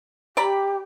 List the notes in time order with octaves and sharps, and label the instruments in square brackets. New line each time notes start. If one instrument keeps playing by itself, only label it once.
[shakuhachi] G4 [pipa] D5 A#5 B5